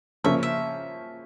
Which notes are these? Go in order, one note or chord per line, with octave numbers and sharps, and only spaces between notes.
C#3 F3 A#3 C#4 E5
E5